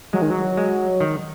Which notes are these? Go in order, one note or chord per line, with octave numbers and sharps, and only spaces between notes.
F#3 G#3
D#3
F#3
G#3
D#3